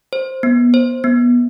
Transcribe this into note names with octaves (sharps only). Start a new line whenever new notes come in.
C5
B3
C5
B3